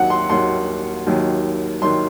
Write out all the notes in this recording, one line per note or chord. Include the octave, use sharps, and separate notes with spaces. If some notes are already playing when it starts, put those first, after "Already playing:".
Already playing: D#2 D#3 F#3 F#5
C6
D#2 D#3 F#3 C6
D#2 D#3 F#3
D#3 F#3 C6